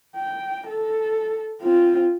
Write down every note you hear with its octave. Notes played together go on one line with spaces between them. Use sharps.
G5
A4
C4 F4